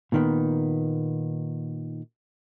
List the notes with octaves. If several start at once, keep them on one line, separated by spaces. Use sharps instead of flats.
A#2 D#3 B3